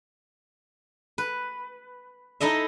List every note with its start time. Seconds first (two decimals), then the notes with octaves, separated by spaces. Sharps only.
1.18 B4
2.40 D#4 E4 A4 D#5 E5